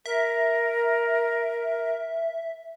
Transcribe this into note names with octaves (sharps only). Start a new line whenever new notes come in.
A#4 E5